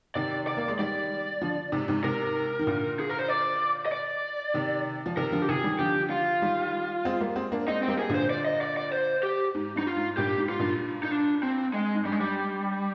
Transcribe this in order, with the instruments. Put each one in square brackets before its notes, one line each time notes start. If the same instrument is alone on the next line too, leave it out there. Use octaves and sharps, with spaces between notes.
[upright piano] C3 D#3 [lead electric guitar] D5
[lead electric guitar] D5
[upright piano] A#3
G#3
[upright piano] D#3 G3 [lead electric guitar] D5
[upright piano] D3 F3
G#2 C3
G#2 C3
[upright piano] G#2 C3 [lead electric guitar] A#4
[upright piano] D#3
A#2 D3
[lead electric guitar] G#4
A#4
C5
D5
D#5
D5
[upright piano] C3 D#3
F3
[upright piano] C3 D#3 [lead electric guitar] A#4
[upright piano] D3 F3
[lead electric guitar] G4
[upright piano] C3 D#3 [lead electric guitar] G#4
[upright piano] D#3 G3
[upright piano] D3 F3 [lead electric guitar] G4
[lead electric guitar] F4
[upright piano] D#3 G3
G#3 C4
G3 A#3
G#3 C4
A#3 D4
[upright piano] G#3 C4 [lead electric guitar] D#4
[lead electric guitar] C4
[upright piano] G3 A#3
[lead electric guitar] G#4
[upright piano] A#2 D3
[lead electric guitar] C5
D5
D#5
D5
D5
C5
G4
[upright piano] G#2
[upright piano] G2 [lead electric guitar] D#4
[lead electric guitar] F4
[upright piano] G#2
[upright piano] G2 A#2 [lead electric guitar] G4
[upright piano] G#2
[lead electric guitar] F4
[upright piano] G2 A#2
[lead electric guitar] D#4
D4
C4
G#3
[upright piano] G#2
[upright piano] G2 [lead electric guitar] G3
[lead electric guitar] G#3
G3